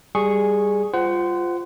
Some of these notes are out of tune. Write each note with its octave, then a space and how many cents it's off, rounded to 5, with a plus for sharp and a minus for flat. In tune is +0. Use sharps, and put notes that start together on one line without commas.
G3 +5 G#4 +0 C#6 -10
F4 +0 C5 -20 F#5 +20